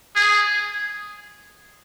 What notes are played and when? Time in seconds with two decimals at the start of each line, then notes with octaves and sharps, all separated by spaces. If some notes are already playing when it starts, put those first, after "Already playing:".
0.16 G#4